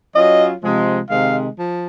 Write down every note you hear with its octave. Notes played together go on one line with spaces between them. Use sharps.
F#3 C#4 F4 D#5
C3 F3 G#3
C3 D#3 G#3 C4 F5
F3